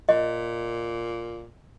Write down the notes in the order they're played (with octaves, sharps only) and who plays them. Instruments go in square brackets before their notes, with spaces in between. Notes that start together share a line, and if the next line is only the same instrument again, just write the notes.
[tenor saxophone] A#2 [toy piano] D#5